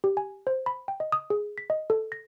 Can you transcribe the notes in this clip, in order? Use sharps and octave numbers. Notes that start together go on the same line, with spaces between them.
G4
G#5
C5
B5
G5
D#5
D#6
G#4
B6
D#5
A4
A#6